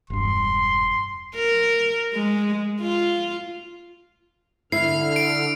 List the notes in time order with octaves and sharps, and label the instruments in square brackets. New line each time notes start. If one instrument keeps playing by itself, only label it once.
[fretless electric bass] E1 G2 [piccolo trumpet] C6
[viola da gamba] A#4
G#3
F4
[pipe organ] D3 F6 [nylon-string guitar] E4 [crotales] C7
[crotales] D7